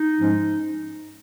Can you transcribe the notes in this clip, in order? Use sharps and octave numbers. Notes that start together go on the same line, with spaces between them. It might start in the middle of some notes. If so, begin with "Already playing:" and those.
Already playing: D#4
G#2 F3 G#3 C#4